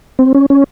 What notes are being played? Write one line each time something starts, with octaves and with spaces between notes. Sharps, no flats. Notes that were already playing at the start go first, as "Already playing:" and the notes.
C4
C#4
C#4